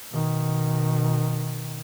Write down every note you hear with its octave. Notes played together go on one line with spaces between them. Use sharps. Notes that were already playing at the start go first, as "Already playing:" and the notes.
B2 D#3